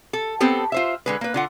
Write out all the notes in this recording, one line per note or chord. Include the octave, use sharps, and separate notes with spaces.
A4
B3 C4 G4 A4
F4 C5 E5
D3 G#3 B4
A#3 B4
D3 F4 F#5